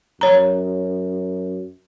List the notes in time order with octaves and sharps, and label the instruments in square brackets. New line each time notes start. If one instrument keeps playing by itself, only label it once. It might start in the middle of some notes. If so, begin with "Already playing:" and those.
[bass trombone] F#2 [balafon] C#5 A#5